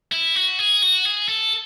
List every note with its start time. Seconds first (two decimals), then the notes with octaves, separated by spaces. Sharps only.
0.12 E4
0.36 F#4
0.59 G#4
0.82 F#4
1.05 G#4
1.29 A4